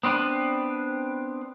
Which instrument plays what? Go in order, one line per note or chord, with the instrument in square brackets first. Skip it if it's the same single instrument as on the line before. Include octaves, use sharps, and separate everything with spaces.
[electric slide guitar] B3 C4 D4 B4